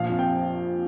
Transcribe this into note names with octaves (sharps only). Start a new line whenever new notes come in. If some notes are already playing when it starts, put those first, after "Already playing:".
Already playing: A#1 F3 F5
F2
G5